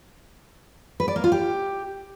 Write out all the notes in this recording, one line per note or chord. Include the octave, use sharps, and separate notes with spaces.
B4
D5
A#3
F4
G4